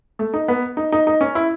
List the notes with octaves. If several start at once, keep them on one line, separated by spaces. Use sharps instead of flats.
A3
D#4
B3
D#4
D#4
D#4
C#4
E4